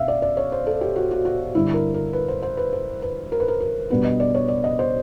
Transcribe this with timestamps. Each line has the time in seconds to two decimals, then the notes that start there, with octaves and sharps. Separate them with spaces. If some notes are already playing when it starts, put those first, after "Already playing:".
Already playing: B2 B3 D4 E5 F5
0.08 D5
0.22 D5
0.37 C#5
0.52 C5
0.67 A4
0.81 G4
0.96 F#4
1.11 F#4
1.25 F#4
1.55 G2 D3 G3 E4
1.74 A#4
1.94 A#4
2.13 B4
2.28 C5
2.42 C5
2.57 B4
2.73 C5
3.02 B4
3.32 A#4
3.40 B4
3.48 A#4
3.60 A#4
3.90 B2 G3 B3 D4 B4
4.05 D#5
4.20 D5
4.34 C#5
4.48 D5
4.64 D#5
4.79 C5